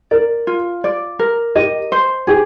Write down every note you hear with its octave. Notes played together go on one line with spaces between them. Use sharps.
A#4 D5
F4
D5
A#4
G4 D#5
C5
G4 G#4